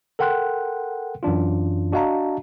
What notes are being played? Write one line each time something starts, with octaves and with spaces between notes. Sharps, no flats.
A4 A#4 F#5 G5 C6 F#6
F#2 E3 D4 F4
D4 F#4 D#5 F5 A5 A#5